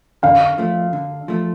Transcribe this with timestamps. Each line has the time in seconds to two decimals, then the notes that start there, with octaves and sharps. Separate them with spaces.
0.23 D3 F5
0.58 F3 A3
0.93 D3
1.28 F3 A3